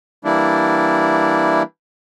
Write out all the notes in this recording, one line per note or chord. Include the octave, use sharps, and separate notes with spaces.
E3 G3 A#3 D4 E4